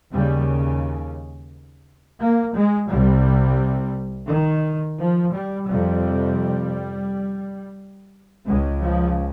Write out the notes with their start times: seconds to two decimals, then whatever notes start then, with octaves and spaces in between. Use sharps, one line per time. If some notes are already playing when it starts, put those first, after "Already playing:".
0.12 D#2 C#3 G3
2.21 A#3
2.54 G#3
2.90 C2 C3 G3
4.29 D#3
4.98 F3
5.33 G3
5.67 F2 C3 G3
8.46 C#2 C#3 G#3
8.80 F3